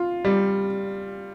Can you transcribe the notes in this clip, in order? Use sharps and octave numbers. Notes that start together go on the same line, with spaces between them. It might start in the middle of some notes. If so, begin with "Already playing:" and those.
Already playing: F4
G3